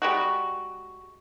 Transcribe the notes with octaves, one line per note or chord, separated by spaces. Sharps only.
G3 G#3 F#4